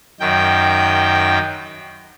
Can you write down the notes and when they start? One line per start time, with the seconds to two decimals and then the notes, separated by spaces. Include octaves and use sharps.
0.20 F#2 D#3 G5